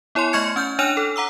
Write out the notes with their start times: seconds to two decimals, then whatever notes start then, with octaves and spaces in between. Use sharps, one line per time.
0.15 B3 E4 C#5 G#5 C6
0.33 A3 D#5 C#6 F6 G#6 C#7
0.56 C#4 F6 G6
0.79 D4 C#5 G#5 F6 F#6 F7
0.97 A4
1.16 F#5 A#5 D6 E6